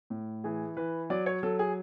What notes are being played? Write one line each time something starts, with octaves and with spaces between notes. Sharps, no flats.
A2
E3 G#4
E3 B4
F#3 D5
C#5
F#3 A4
G#4